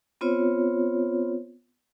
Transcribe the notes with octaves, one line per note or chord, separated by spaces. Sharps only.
B3 C4 F4 C5 C#5